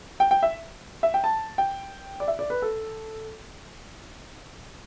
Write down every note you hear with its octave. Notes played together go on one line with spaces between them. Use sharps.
G5
G5
E5
E5
G5
A5
G5
D5
E5
D5
B4
A4